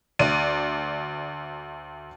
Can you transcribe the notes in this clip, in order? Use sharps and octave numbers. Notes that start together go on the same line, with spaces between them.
D2 D5 D#7